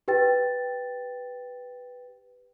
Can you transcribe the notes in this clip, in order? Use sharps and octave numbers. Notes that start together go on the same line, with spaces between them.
G4 B4 G5 A6